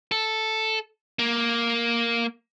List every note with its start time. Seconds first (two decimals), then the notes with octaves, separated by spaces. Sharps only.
0.11 A4
1.19 A#3